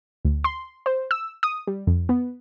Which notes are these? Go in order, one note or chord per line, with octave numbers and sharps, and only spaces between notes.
D2
C6
C5
E6
D#6
G3
F2
B3